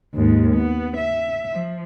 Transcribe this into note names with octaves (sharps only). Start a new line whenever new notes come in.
D#2 G#2
B3
E5
F3